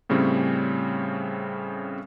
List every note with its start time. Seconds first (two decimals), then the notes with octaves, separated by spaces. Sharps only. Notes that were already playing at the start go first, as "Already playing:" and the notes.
0.09 A2 C#3 G3 C4 C#4